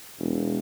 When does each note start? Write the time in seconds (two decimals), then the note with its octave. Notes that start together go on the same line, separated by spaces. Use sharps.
0.19 E1